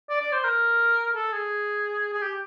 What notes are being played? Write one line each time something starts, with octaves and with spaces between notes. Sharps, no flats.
D5
D5
C5
A#4
A4
G#4
G#4
G4